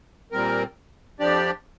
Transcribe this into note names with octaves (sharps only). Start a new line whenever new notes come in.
A#2 G3 C4 A#4
F2 F3 D4 G4 D5